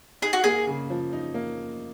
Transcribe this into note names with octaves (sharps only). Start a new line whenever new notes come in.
D#4 G#4
F#4
A#3 G#4
C#3
F3
D#4
A#3